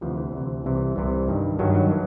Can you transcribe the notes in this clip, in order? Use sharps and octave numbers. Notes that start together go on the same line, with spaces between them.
D2 C3 E3 F3
E3
D2 C3 E3
C2 C3 E3
C2 C3 E3
G2 D#3
G2 D#3 F#3
F#3
E3